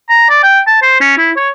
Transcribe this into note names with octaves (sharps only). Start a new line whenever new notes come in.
A#5
D5
G5
A5
C5
C#4
E4
C#5